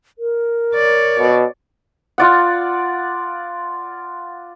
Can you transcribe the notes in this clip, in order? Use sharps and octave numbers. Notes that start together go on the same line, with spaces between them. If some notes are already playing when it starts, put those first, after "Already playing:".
A#4
C#5 D5
B2
F4 D5 F#5